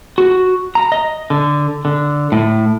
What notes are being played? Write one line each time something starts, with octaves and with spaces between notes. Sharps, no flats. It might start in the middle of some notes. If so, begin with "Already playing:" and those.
F#4
A#5
D#5
D3
D3
A2